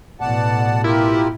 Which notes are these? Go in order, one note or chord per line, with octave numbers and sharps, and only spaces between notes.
A1 B2 D5 F#5 A5
E4 F4 G4 A#4